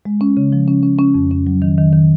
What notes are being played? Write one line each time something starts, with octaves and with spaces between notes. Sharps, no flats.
G#3
C#4
C#3
F3
C#4
C#4
C#4
F2
C#4
F#3
D#3
D#3
D#3